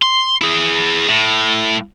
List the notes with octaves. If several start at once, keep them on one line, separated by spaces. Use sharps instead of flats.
C6
E4 G#4
A2